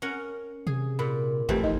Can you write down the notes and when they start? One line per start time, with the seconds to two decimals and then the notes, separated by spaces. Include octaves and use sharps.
0.02 C#4 A#4 F#5
0.67 C3 G#4
0.99 A#2 B5
1.49 G#1 F2 E3 A3 C4 G4
1.63 G1 D#4 D#5